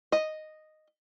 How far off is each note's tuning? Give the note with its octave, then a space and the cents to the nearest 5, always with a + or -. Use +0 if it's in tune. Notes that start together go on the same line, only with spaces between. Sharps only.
D#5 -5